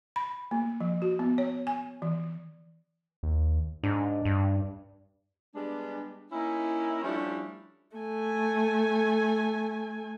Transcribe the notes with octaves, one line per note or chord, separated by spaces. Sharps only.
B5
A#3
F3
F#4
B3
C#5
G#5
E3
D#2
G#2 D4
G2
G3 G#3 B3 D4
A#3 C#4 D#4 E4
F3 G3 A3 C#4 D4 E4
A3 G#5